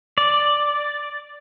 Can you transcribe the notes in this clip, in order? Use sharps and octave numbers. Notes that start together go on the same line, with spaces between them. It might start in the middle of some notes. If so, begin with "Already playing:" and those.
D5